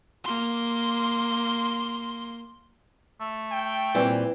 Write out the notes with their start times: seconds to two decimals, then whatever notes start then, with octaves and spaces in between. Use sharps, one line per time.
0.24 A#3 C6
3.21 A3
3.52 G5
3.95 A#2 E3 G3 C4